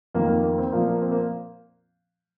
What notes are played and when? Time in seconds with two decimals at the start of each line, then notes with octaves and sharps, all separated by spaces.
0.15 F2 D#3 A#3
0.28 A#3
0.43 A#3
0.58 C4
0.72 A#2 F3 A#3
0.88 A#3
1.02 C4
1.12 A#3